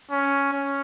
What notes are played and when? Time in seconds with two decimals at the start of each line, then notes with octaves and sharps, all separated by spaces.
0.11 C#4
0.53 C#4